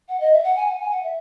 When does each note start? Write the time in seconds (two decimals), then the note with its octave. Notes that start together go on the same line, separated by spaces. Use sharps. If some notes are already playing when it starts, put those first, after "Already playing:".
0.08 F#5
0.20 D#5
0.32 E5
0.43 F#5
0.56 G#5
0.67 F#5
0.79 G#5
0.91 F#5
1.03 E5